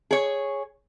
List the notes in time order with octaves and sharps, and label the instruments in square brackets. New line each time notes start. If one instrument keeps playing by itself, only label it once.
[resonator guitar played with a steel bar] G#4 C#5